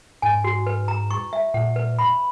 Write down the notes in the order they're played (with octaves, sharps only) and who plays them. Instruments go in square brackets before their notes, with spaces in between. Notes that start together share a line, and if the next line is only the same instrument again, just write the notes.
[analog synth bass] G#2 [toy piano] G#5
[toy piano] F#4
B4
A#5
C#6
E5
[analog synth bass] A#2 [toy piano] F#5
[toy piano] B4
B5